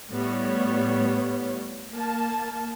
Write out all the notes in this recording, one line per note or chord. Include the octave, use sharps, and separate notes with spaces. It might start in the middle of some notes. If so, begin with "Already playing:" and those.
A2 G3 B3 C#5
A#3 A5